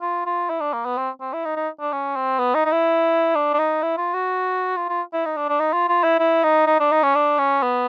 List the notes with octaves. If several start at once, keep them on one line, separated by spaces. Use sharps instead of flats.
F4
F4
E4
D4
A#3
B3
C4
C4
E4
D#4
D#4
D4
C#4
C4
B3
D#4
D#4
E4
D4
D4
D#4
E4
F4
F#4
F4
F4
E4
D#4
D4
D4
D#4
F4
F4
E4
E4
D#4
D#4
D4
D#4
C#4
D4
C#4
B3